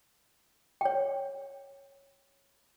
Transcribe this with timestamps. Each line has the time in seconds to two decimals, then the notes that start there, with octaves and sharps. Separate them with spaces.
0.81 C#5 G5